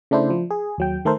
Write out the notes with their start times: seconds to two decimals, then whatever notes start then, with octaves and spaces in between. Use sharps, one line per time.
0.11 C#3 A3 D4 E4 C5
0.30 F3
0.50 G#4
0.78 D#2 F#3 G5
1.05 D#3 A3 A4 A#4 C5